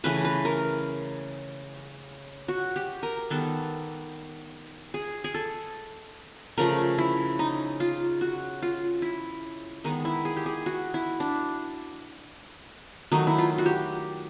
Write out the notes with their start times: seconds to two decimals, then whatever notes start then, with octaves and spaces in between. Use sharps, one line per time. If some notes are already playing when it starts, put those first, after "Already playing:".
0.04 C#3 E3 A3 B4
0.25 B4
0.45 A#4
2.48 F#4
2.76 G4
3.03 A#4
3.30 D#3 G3 B3 A4
4.94 G#4
5.24 G#4
5.34 A4
6.58 C#3 F3 A3 A#4
6.98 E4
7.39 D#4
7.80 F4
8.21 F#4
8.62 F4
9.02 E4
9.84 D#3 G#3 B3 D#4
10.05 E4
10.25 G#4
10.37 G4
10.46 G#4
10.66 F#4
10.94 E4
11.20 D4
13.12 D#3 F#3 A3 D#4
13.27 E4
13.38 F4
13.58 F#4
13.66 G4